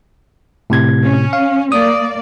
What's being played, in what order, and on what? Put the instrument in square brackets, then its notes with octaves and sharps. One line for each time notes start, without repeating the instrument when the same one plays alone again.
[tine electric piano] A2 C3 G#6
[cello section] C#4
[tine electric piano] F5
[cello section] A#3 D5 [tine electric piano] D#6